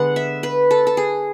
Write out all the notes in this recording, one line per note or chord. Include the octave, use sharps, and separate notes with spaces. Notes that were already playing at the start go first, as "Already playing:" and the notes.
Already playing: D3 G#3 B3 F#5
E5
B4
A4
A4
G#4